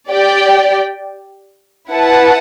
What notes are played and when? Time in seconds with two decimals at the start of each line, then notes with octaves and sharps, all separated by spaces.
0.11 G4 D5 G5
1.91 E4 B4 F#5 A5